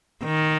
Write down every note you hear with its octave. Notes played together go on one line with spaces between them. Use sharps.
D#3